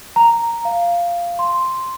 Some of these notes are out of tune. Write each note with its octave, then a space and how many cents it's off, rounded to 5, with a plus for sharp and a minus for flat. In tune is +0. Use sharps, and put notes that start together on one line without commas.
A#5 -5
F5 -10
C6 +0